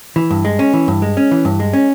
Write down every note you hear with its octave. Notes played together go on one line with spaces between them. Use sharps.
E3
G2
G#3
C#4
E3
G2
G#3
C#4
E3
G2
G#3
C#4